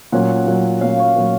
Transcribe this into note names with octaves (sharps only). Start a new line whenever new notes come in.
A#2 F#3 C#4 F#5
F#5
A#2 F#3 C#4 F#5
A#2 F#3 C#4 F5
C#5
A#2 F#3 C#4